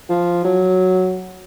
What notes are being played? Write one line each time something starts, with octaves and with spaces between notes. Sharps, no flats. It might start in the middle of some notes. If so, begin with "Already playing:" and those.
F3
F#3